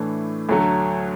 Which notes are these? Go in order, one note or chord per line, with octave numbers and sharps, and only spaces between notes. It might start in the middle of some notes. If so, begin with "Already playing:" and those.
Already playing: A2 E3 A3 D4
D2 D3 F#3 A3